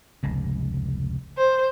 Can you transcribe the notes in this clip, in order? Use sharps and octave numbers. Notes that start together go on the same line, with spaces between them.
F1 C#2 G#2
C5